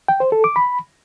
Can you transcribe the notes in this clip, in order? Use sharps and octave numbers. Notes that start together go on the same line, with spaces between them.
G5
C5
A4
D6
B5